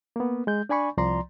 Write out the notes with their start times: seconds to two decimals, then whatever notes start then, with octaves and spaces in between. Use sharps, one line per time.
0.16 A#3 B3
0.47 G#3 G6
0.69 D4 D5 G#5 B5 C#6
0.97 C2 F3 D5 A#5 C6